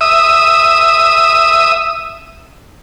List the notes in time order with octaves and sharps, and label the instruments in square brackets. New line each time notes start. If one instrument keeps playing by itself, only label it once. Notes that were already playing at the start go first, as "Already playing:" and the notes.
[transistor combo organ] E5 D#6